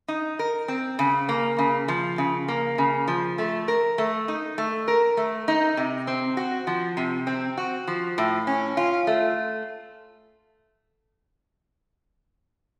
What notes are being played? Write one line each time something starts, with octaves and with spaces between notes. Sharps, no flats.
D#4
A#4
C4
C#3
A#3
C#3
F3
C#3
A#3
C#3
F3
A3
A#4
A3
D#4
A3
A#4
A3
D#4
C3
C4
F#4
F3
C3
C4
F#4
F3
A2
C#4
F4
A3